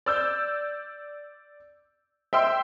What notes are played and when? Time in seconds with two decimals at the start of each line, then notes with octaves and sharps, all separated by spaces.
0.06 D5 E6 G6
2.33 E5 G5 C6 E6